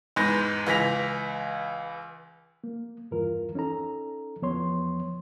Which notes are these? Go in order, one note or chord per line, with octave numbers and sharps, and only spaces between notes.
E2 G#2 B4 G6 A#6
C#2 E3 A#6 B6 F7
A#3
E2 G2 E3 F4 A#4
C#4 D#4 A4 A#5
E2 F3 B3 C#5 C6